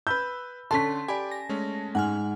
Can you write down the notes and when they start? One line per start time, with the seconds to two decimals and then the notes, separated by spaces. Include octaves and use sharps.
0.07 B4 B5 E6 G6
0.71 D3 C#4 A4 A5 C6 B6
1.08 G4 D5 G#5 B5
1.31 A#6
1.49 G#3 A3 C#4
1.95 G#2 F#5 G#5 F6